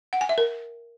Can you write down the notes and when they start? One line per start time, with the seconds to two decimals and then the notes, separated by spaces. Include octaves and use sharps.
0.13 F#5
0.21 G#5
0.29 E5
0.38 A#4